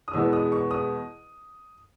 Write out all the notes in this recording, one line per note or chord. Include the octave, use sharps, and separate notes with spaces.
D#6
E2 B2 G#3 B3 E6
D#6
C#6
D#6